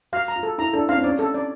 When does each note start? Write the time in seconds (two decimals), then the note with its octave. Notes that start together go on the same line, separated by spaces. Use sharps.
0.12 F#4 F5
0.28 A#5
0.36 F4
0.43 A4
0.58 E4 A#5
0.73 D4 A4
0.88 C#4 F5
0.97 C4
1.04 C#4 D5
1.19 A4
1.34 D5